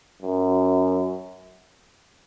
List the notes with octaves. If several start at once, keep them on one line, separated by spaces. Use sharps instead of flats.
F#2